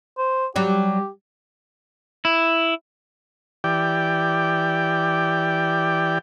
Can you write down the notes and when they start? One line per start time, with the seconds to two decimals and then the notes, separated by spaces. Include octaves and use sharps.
0.18 C5
0.56 F#3 G3 G4
2.25 E4
3.64 E3 G4 D5 G5